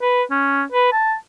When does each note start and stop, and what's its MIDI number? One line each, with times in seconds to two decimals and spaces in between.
0.01 0.23 71
0.31 0.63 61
0.72 0.91 71
0.92 1.14 81